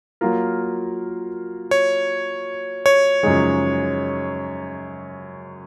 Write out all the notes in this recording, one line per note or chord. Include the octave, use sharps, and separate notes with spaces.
F#3 A#3 F4 A#4
C#5
C#5
F#2 C#3 F3 G#3 D#4